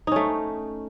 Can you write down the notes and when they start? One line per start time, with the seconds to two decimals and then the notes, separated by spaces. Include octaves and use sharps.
0.07 D#4
0.12 C#4
0.16 A3